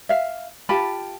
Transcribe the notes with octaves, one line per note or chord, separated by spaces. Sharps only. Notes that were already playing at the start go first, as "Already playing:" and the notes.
E5 F5
F4 G4 A5 B5